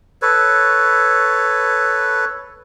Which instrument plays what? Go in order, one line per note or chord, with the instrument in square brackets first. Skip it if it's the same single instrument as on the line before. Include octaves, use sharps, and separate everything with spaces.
[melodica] A4 B4 C#5